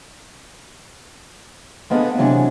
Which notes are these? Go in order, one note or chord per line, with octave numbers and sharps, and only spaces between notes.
G#3 A#3 B3 D4 G#4 A4
C3 E3 F#3 G#3 D4